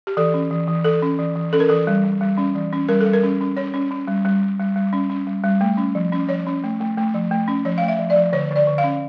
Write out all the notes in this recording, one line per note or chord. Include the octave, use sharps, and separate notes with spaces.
G4
E3 A4
C#4
E3
E3
E3 A4
C#4
E3
E3
C#4 A4
A#4
E3 A4
G3
G3
G3
C#4
E3
C#4
G3 A#4
A4
G3
A#4
C#4
C#4
C#4 C#5
C#4
C#4
G3
G3
G3
G3
G3
C#4
C#4
G3
G3
A3
C#4
F3
C#4
F3 C#5
C#4
A3
A3
A3
F3
A3
C#4
F3 C#5
A3 F5
E5
F3
D5
F3
D3 C#5
D3 D5
D3
F5
C#4